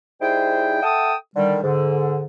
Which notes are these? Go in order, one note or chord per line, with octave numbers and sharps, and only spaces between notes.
G3 D#4 E4 G#4 C5 G5
A4 E5 F#5 G5 A5 D#6
D3 D#3 G3
G#2 D3